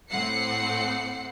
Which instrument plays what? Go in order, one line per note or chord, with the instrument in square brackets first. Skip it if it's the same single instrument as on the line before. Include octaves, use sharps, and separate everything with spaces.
[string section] A2 A3 C4 F#5 C7 C#7